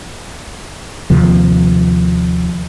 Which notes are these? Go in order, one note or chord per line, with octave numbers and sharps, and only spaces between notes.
D#2 C3 F3